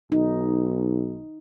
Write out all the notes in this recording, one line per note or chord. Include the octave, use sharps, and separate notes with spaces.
B1 D#4